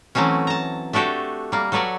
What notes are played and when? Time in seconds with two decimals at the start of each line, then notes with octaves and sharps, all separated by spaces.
0.15 E3 F#3 A3 C4 C#4
0.47 A5 A#5
0.93 A3 D4 F#4 G4 A4
1.52 G3 A#3
1.72 F#3 A4 B4 C#5 D5